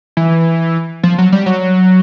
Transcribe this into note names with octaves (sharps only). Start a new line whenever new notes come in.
E3
F3
F#3
G3
F#3